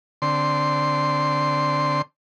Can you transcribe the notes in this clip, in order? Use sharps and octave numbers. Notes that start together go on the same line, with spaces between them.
D3 C4 C6